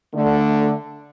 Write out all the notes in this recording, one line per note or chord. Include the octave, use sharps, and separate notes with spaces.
D3 A3